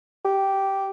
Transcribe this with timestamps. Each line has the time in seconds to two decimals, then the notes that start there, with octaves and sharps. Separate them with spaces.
0.25 G4